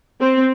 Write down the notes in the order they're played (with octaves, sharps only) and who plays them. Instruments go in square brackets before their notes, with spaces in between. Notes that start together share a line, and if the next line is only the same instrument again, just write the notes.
[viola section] C4